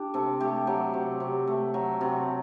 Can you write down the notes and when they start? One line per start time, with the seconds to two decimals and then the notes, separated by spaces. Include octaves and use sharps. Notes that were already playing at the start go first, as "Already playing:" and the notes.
Already playing: D4 G4
0.14 C3 A4
0.40 A3 G4
0.67 F#3 G4
0.94 C3
1.20 C3
1.47 A3
1.74 F#3
2.01 C3